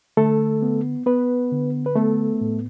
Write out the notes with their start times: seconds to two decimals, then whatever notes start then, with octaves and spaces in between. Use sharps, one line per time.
0.17 D3 A3 A4
0.62 B3
1.06 B3 B4
1.52 D3
1.86 B4
1.95 A3 B3 A4
2.41 A2